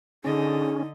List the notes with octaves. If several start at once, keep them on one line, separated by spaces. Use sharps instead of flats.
D3 C#4 D#4 G#4 D#5